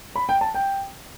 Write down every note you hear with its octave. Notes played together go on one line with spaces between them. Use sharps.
B5
G5
A5
G5